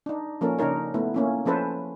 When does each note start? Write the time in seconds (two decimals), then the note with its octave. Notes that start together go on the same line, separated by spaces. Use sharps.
0.06 D4 D#4
0.41 F3 A#3 C#4 A4 A#4
0.59 C#3 D4 D#4 A#4 C#5
0.94 A3 B3 E4
1.14 A#3 C#4 E4
1.46 F3 C#4 A4 B4 C5